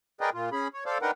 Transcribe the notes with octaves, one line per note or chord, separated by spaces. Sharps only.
G#4 A#4 B4 D5 D#5 G5
A#2 F4
C#4 G#4 B5
C#5
A4 C5 D5 F5
D4 D#4 A#4 B4 F#5 G5